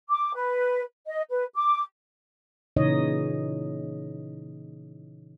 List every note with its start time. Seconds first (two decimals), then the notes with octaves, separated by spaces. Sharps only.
0.10 D6
0.35 B4
1.07 D#5
1.30 B4
1.55 D6
2.76 A#2 C#3 E3 D#4 C#5 D#5